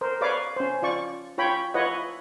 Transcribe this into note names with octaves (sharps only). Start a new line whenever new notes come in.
A#4 C5
B4 C#5 D5 F5 D6
C#4 C5
F4 D5 C#6
F4 C#5 G5 B5
E4 F4 B4 C#5 D#5 F#5